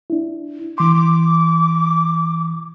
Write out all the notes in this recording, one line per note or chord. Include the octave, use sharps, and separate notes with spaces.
D4 E4
E3 C6 D6
D6